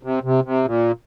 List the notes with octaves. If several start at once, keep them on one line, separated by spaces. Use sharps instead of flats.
C3
C3
C3
A#2